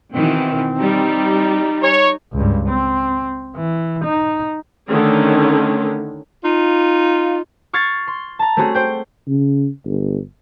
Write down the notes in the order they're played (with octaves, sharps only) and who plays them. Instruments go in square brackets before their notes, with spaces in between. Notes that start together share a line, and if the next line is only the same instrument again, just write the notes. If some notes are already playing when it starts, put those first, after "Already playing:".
[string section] B2 D#3 E3 [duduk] C4
[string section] G3 [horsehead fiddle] D#4
[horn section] C#5
[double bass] C#2 G2
C4
E3
D#4
[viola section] D3 D#3 A3 C#4
[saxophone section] D#4 F4
[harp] C#6 F6 G#6 A6 C7
C6
A5 A#5
A3 C4 C#4 F#4 G#4
C5 G5
[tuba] C#3
G1